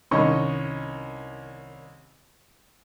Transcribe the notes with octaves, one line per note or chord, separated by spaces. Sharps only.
C2 D#3 C#4 D#5 C#6